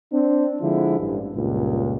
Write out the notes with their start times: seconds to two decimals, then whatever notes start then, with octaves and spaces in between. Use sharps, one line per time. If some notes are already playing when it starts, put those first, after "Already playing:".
0.12 C4 D4
0.61 D3 F3 G#3 E4
0.99 A1 G2
1.34 C#2 G2 A#2